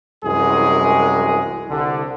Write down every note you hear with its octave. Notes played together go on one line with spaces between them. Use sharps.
C2 F#2 E3 G#3 G#4
C2 D3